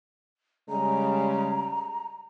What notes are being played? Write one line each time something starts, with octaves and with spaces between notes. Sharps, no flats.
C#3 G3 G#3 A#5